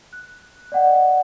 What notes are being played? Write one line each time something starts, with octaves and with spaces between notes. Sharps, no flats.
F#6
D5 D#5 F#5 G5